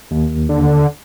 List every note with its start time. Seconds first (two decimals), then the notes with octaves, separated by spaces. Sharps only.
0.11 D#2
0.49 D3